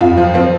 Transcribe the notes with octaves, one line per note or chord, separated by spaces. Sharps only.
F2 F4
F3
F3 C4